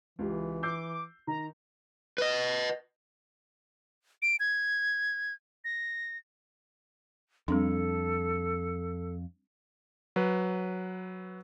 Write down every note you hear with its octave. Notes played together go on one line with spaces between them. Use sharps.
C#2 E3 G4
D6 E6 G6 C7
D#3 A#5
B4 D#5
D7
G#6
A#6
F2 G3 C4 D4 A4
F#3 B4